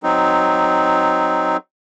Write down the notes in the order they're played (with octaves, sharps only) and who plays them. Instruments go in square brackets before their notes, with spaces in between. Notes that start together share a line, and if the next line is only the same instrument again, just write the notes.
[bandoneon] F#3 C4 D#4